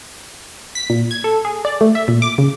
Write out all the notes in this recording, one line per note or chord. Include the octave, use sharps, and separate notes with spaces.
B6
A#2
G#6
A4
G#4
D5
A3
E5
A#2
D6
C#3